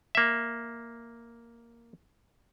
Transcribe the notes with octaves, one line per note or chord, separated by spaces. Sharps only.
A#3 E5